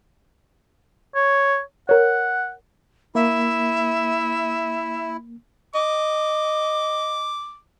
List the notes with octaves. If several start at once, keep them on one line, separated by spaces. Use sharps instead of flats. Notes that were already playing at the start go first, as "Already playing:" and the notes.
C#5
A#4 C#5 F#5
A#3 E4 E5
D#5 D6